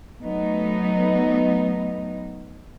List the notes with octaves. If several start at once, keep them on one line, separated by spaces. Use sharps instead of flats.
F#3 A3 B3 D#4